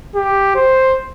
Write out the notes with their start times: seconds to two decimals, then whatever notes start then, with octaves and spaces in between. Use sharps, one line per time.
0.16 G4
0.55 C5